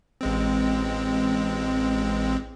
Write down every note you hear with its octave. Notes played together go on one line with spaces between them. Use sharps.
A1 G#3 C4